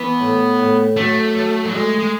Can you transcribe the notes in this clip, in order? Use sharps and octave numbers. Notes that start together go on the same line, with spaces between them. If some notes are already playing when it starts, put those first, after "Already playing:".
Already playing: E3 B3
A2
A2
F#2 A3
F#2
F#3
G#3 A3
G#3